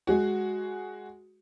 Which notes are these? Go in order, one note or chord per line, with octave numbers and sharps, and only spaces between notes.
G#3 F#4